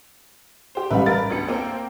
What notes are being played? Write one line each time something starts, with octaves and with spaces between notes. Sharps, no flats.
G4 C5
A1 G3 B4 E5 F5 B5
A#4 B4 A6
D2 B3 C#7
A#3 C4 G5